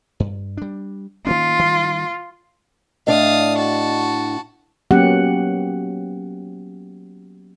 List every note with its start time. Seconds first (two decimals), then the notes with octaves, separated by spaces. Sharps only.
0.20 G2
0.57 G3 D4
1.27 D#3 A#3 C#4 F4
1.59 D#3 G3
3.07 A2 D4 D#5 F5 D#6
3.57 F#4 A5
4.91 F#3 A#3 B3 C#4 G4 F#5